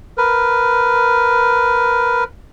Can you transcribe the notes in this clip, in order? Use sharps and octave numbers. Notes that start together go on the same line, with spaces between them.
A#4 B4